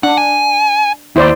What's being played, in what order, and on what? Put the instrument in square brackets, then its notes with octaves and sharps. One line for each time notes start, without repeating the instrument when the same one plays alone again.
[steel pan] D4 [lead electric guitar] F#5
[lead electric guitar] G#5
[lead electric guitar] D#2 [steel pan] E4 C5 D5